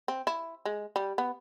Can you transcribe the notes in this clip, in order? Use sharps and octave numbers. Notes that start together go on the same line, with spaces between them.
C4
E4
G#3
G3
B3